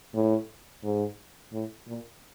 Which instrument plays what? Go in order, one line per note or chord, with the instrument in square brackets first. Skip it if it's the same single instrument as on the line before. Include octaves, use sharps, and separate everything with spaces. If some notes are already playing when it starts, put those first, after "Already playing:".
[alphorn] A2
G#2
A2
A#2